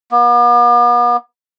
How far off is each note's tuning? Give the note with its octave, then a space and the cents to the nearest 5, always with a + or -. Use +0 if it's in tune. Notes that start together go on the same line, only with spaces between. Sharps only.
B3 -45